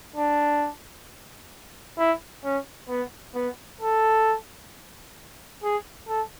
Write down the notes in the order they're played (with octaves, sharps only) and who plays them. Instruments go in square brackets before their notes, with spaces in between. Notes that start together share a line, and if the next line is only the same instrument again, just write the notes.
[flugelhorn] D4
E4
C#4
B3
B3
A4
G#4
A4